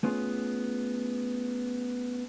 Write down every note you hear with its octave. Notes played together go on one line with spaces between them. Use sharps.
A3 B3 C#4 F4 G#4